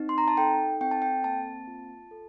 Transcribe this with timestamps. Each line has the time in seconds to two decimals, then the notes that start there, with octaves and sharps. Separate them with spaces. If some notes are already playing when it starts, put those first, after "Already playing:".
Already playing: C4 D#4
0.09 C6
0.18 A#5
0.28 A5
0.37 A4 G5
0.81 C4 G5
0.91 A5
1.02 G5
1.24 A#3 A5
1.67 F4
2.11 A4